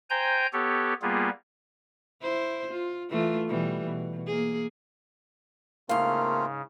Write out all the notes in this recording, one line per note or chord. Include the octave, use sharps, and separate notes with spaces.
C5 G5 G#5 A#5 G6
B3 G4 A4 C#5
G3 A#3 B3 F4 G#4
E4 C5
F4
E3 A3 F4
B2 E3 G3
B2
A#3 G#4
G#2 C#3 A3 A#3 C4 F4 F5